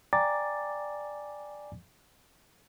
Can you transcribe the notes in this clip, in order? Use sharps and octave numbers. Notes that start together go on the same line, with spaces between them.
D5 G5 G#5 A#5 D6 A6